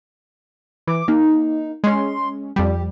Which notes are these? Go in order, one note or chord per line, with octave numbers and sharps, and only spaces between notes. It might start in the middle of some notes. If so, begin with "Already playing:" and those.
E3 D6
A#3 D#4
G#3 C#4 C6
F2 G3 G4